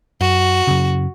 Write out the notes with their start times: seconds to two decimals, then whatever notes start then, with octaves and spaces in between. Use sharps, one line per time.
0.21 F#2 F#4
0.67 F#2 C#3